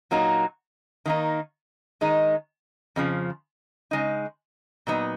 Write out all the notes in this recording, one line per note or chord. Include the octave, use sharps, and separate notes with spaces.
A#2 F#3 A#3 D#4
D#3 A#3 D#4
D#3 G#3 D#4
F2 C#3 F3
C#3 G#3 D#4
A#2 F#3 B3 D#4